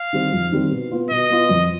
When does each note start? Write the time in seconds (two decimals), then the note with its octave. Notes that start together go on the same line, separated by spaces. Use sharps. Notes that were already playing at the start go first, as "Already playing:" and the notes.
Already playing: F5
0.13 D#3 G3 C4 G4
0.33 F2
0.52 D#3 G3 C4 G4
0.71 B2
0.91 B3 F4
1.11 B2 D#5
1.30 B3 F4
1.49 F2